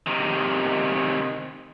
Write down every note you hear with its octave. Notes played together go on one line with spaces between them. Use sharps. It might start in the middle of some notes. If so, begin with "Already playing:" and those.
C3 D#3